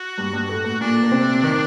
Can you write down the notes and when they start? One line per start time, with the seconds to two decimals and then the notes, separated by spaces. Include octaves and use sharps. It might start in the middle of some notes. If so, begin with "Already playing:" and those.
Already playing: F#4
0.18 G2 G3
0.33 G2 G3
0.49 A2 A3
0.64 A2 A3
0.80 A#2 A#3 D4
1.03 A#3
1.11 C3 C4
1.43 D#3